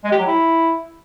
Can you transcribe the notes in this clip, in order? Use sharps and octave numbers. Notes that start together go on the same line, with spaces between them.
G#3
G4
F#3
E4